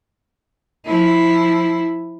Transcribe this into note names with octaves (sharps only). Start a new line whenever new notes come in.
F3 E4